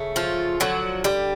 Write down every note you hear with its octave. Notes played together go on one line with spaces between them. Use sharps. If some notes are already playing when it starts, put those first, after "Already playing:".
Already playing: C#3 A3
F3 F4
D3 F3 F#3 F#4
G3 G4